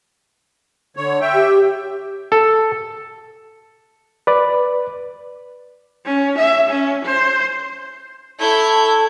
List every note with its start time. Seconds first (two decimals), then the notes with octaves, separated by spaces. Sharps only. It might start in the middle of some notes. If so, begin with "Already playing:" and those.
0.97 D3 C#5
1.21 E5 G5
1.34 G4
2.32 A4
4.27 B4 D5
6.05 C#4
6.38 E5
6.69 C#4
7.05 C5
8.40 E4 A4 C#5 A5 G6